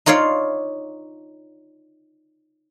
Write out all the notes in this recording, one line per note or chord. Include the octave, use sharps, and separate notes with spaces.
D#4 F4 C#5 D5 F5